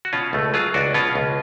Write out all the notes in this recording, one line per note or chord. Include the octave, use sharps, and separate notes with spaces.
F#4
B2 C#4 F4
C#2 A3
F#3 F4 G#4
C#2 D4 F#4
B2 C#4 F4
C#2